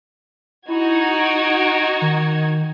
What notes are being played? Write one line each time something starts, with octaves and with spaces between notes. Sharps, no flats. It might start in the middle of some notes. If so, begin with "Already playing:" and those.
D#4 E4 F#4 G#6
D7
D#3